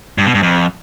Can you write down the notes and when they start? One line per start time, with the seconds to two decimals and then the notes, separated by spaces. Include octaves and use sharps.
0.18 G2
0.26 B2
0.34 G2
0.43 F2